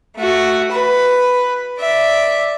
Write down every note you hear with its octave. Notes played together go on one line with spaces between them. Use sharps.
A3 F#4
B4
D5 E5